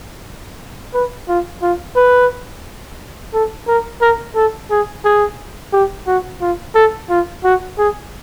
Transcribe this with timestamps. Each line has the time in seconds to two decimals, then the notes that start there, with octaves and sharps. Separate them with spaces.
0.94 B4
1.28 F4
1.62 F4
1.96 B4
3.33 A4
3.67 A#4
4.01 A#4
4.36 A4
4.71 G#4
5.05 G#4
5.73 G4
6.07 F#4
6.41 F4
6.75 A4
7.10 F4
7.44 F#4
7.78 G#4